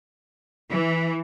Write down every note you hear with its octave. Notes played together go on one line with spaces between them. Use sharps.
E3